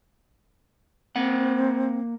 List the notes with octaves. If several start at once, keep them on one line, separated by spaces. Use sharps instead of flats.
A#3 C4 F#5